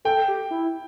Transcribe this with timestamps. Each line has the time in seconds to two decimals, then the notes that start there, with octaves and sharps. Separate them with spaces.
0.05 A4 G5
0.28 G4
0.51 E4